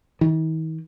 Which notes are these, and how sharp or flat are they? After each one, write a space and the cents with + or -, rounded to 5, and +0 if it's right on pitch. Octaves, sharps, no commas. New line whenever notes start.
D#3 +45